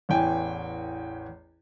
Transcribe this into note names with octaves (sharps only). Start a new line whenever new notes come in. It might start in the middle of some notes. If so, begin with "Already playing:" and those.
A1 E2 G5 G#5